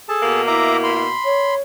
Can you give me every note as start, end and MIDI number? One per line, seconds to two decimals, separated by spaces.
0.09 0.42 68
0.09 0.42 69
0.09 0.42 81
0.22 1.11 47
0.22 1.11 58
0.47 1.03 64
0.47 0.77 76
0.47 0.77 82
0.47 0.77 86
0.84 1.55 83
0.84 1.55 84
1.25 1.60 73